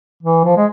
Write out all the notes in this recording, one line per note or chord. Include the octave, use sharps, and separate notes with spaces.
E3
F3
G#3